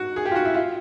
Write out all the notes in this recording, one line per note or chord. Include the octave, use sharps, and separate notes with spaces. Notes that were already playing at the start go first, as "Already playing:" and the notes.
Already playing: F#4
G#4
G4
F4
F#4
E4
F4